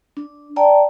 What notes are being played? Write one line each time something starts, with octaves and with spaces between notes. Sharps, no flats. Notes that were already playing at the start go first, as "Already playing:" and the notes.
D4
D5 G5 A5 A#5